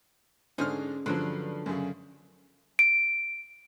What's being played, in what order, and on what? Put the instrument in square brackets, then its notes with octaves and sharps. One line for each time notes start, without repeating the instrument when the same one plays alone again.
[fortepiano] G#2 D3 F6 [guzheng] C#4 G#4 C5
[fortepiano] G2 F3 [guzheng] D3 F#3
[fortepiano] F#2 C#3
[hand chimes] D7